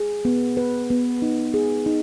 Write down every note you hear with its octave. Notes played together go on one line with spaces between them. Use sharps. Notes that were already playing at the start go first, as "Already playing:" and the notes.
Already playing: G#4
B3
B4
B3
D#4
G#4
D#4